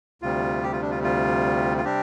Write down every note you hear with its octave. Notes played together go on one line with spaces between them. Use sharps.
D2 C3 G3 F4
G4
F4
D4
F4
F4
F4
C3 G3 C4 D4 G4